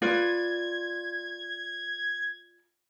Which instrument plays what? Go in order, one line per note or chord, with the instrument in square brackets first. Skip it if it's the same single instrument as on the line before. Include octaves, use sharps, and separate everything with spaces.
[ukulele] F4 B4 D5 [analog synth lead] G#6